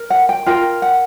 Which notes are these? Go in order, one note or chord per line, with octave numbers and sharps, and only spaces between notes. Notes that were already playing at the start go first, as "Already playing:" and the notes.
Already playing: A#4
F#5
G5
F4 A#4 G5
F#5